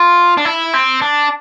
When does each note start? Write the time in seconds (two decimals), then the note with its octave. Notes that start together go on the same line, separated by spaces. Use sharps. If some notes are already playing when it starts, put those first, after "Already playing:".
Already playing: F4
0.37 D4
0.45 E4
0.74 C4
1.02 D4